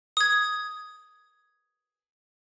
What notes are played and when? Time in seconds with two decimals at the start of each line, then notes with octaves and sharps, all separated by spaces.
0.17 D#6 G#6